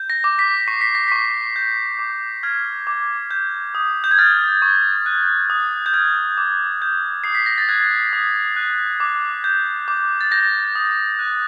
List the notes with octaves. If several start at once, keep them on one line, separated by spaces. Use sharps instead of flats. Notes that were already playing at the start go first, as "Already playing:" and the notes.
Already playing: G6
A#6
D6
B6
C#6 C7
B6
A#6
C#6 B6
G6
D6
F6 G#6
D6
G6
D#6
G6
G#6
F6 A6
C#6
F#6
D#6
G6
F6 G#6
D6
G6
D#6 C7
B6
A#6
A6
F#6 G#6
D#6
F#6
D6
G6
D6
A6
G6 A#6
D#6
F#6